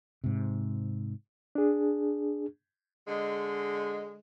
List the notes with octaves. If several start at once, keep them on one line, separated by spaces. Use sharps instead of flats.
G#2 C3
D4 G#4
D3 G#3